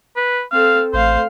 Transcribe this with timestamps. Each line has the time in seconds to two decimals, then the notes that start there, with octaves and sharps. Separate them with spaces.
0.16 B4
0.52 C4 A4 F5
0.93 A1 A3 C5 F5